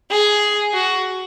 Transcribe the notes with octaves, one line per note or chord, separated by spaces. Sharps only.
G#4
F#4